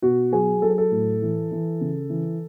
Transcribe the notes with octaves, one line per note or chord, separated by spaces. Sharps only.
B2 F#4
F#3 G#4
F#3 A4
G#4
A4
A2
E3
E3
C#3
E3